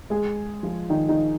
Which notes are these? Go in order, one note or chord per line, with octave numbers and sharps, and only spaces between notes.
G#3 G#4
F3 F4
D#3 D#4
D#3 D#4